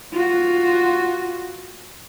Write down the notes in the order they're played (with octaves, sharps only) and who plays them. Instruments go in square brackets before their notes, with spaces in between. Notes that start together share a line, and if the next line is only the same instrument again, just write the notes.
[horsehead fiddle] F4 F#4